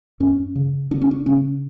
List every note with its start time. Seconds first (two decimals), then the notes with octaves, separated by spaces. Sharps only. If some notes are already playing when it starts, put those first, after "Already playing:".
0.20 F#2 C#4
0.55 C#3
0.91 C#3 D4
1.01 C#4
1.11 D4
1.26 C#3 C#4